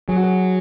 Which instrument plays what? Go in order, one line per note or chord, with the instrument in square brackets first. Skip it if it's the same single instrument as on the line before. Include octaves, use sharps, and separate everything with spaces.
[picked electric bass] F#3 [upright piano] G#4
[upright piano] F#4
G#4